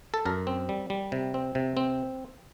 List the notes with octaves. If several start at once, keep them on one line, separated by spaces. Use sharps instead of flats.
A4
F#2 A#4
C4
G3
G3
C3
C4
C3
C4